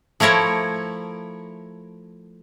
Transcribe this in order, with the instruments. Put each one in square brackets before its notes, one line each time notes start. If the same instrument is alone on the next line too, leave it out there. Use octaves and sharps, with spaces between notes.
[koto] F3 A3 E4 A#4 C#5